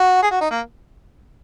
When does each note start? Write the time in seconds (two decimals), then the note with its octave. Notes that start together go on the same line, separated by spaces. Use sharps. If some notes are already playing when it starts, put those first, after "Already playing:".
Already playing: F#4
0.23 G#4
0.31 F#4
0.41 D#4
0.51 A#3